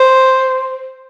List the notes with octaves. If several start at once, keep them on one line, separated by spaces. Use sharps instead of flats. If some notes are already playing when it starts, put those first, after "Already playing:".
Already playing: C5